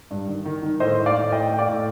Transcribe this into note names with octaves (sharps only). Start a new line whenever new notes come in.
G2
D#3
D#3
D#3
A2 C5 D#5
A2
D5 F5
A2
A2 D#5 G5
A2 G5
D5 F5
A2